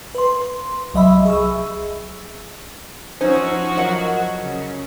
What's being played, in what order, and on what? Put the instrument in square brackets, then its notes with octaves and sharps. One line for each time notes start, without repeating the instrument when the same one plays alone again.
[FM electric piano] B4 C6
C2 F#3 D#5 E5 B5 E6
G#4 C#6 E6
[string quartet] F3 F#4 C#6 [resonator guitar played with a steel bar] C#4 D#4 [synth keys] C5 E6
[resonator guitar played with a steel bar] F#3 A#4 F#5 [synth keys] D#5
[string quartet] C#3